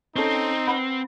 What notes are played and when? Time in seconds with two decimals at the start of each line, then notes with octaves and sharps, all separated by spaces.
0.16 C4 C#4 D#4 A4
0.68 B4 F#5 B5